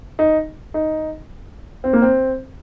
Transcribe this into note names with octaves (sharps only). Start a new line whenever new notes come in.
D#4
D#4
C4
A#3
C4